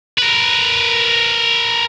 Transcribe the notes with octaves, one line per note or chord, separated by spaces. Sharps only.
A#4 B4